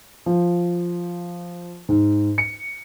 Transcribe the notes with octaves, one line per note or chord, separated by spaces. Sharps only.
F3
G#2
C#7